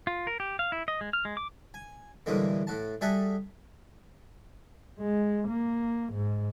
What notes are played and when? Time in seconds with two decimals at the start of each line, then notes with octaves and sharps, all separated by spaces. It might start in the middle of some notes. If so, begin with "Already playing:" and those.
0.07 F4
0.27 A#4
0.40 G4
0.59 F5
0.72 E4
0.88 D#5
1.01 G#3
1.13 F6
1.25 G#3
1.37 D6
1.74 G#5
2.26 E2 A2 D3 G3 G#3 A#3
2.67 A2 F#4 A5
3.01 G3 F#4 G#4 A4 E5 F#5
5.00 G#3
5.48 A#3
6.13 G#2